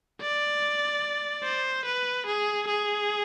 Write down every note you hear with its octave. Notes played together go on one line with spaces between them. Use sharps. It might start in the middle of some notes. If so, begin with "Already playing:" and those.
D5
C5
B4
G#4
G#4